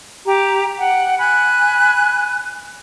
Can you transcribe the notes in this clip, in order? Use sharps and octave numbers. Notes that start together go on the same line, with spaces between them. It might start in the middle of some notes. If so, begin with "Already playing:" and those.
G4 A#5
F#5 G5
G#5 B5 F#6